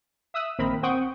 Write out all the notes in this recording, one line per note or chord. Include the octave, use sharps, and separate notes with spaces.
E5 D#6 E6 F#6
A#1 D#3 A#3 C4 A#4 B5
C4 C5 F#5 G5 C#6 D#6